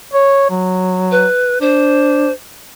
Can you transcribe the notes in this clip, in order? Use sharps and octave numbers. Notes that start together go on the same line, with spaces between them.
C#5
F#3
B4
D4 C5